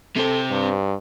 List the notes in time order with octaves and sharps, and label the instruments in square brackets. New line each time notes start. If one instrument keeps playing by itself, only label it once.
[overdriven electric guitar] C3 C4 [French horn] A4
[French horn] G2